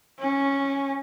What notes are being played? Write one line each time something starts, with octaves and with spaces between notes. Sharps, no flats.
C#4